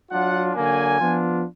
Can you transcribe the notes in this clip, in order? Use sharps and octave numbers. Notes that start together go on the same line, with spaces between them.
F#3 D4 F4 F#5
D3 F#3 A#3 G#5
F3 B3 D4 F4